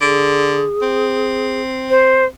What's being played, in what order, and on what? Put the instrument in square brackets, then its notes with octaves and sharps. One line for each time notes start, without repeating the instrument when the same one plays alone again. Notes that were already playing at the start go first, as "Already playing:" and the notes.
[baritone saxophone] D3 [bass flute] G#4
[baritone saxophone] C4
[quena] C5